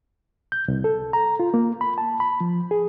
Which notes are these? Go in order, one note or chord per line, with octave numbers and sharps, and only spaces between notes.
G6
C2
A4
A#5
F4
A#3
B5
A5
B5
F3
G#4